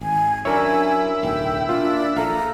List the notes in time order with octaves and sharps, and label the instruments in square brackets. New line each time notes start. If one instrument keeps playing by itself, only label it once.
[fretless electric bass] G#1 [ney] G#5
[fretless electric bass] F#2 [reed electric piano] D4 A#4 C#5 [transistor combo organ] E4 [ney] G#5
[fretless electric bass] D1 B1 [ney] G5
[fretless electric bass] A#2 [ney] D4 [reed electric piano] F4
[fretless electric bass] A#1 [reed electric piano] A4 F5 [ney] A#5